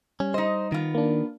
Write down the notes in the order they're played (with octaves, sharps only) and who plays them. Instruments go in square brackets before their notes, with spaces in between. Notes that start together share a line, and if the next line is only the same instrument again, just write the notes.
[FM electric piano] G3 [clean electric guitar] C#4
[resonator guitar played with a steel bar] D#4 D#5 [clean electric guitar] C5
[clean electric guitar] D#3 [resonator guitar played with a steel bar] B3 F4
[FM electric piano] A#3 D4